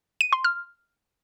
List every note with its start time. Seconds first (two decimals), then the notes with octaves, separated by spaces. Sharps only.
0.21 D#7
0.33 C6
0.44 F6